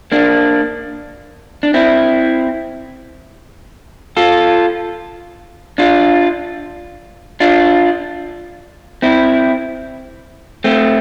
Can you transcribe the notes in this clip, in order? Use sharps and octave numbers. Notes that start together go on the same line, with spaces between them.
A#3 D4
D4
C4 E4
F4 A4
D4 F4
D4 F4
C4 E4
A3 C4